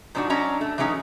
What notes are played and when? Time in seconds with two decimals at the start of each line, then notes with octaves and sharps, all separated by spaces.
0.15 G#2 F3 D4 D#4 F#4
0.30 F#3 C#4 D4 D#5 A#5
0.61 A3
0.78 E3 F#3 G#3 C#4 D#4